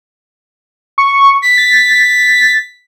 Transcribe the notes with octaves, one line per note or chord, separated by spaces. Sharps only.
C#6
B6
A6